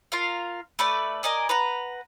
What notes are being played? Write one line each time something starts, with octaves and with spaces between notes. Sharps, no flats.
F4 A#4 F5
A3 B4 D5
A#4 D5 D#5 G#5
B4 F#5 A#5